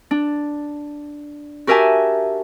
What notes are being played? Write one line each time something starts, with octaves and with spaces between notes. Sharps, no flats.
D4
F#4 G4 A#4 E5 G#5 A5